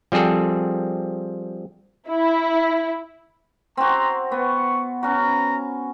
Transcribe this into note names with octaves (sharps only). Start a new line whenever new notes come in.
F3 G3 C4 G#4 A4
E4
C4 F#4 A#5 C6
B3 C#6
C#4 F#4 B4 A#5